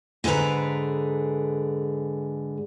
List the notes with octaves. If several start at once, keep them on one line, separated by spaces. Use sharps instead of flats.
G#2 D3 G#4 A4 B4 A#5